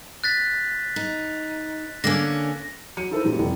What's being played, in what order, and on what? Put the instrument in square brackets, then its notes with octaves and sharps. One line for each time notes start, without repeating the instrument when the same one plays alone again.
[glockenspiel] F#6 A6 B6
[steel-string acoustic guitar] D#4
[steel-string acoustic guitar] D3 A#3 C#4 [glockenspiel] A#6
[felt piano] F#3 C#7 D#7
D#4 E4 A4 A#4 C5
F#2 A#2 E3 G3 D#4
F1 C2